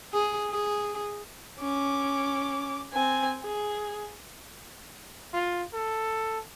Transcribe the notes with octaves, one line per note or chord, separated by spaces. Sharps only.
G#4
G#4
C#4 D6
C4 G#5
G#4
F4
A4